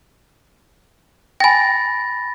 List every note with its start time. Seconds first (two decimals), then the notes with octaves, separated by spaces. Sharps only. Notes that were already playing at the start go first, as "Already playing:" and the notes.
1.40 G5 G#5 B5 A6 A#6